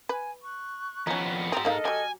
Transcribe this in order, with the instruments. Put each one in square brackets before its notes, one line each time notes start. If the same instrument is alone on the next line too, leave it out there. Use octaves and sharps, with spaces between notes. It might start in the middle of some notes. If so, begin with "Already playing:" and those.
[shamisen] B4 [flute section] G#5
[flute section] C#6 F#6
[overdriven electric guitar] F2 B3 [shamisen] C#4 D#4
[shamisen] F#3 C4 [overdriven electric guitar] G#4 A#5 [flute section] C6
[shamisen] A#3 D#4 F5 [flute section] A4 D#5 F6
[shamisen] F#3 G4 [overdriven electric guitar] G#5